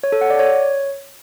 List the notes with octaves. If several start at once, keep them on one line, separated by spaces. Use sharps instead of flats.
C#5
A4
F#5
D5
C#5